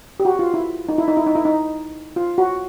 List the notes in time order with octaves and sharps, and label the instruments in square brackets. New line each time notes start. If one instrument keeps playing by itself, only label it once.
[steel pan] G4
F#4
F4
E4
D#4
E4
D#4
E4
D#4
E4
D#4
F4
F#4